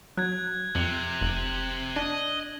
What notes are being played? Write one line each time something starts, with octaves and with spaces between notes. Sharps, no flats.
F#3 F#6 G#6
F2 C3
F1 F#7
D4 D#5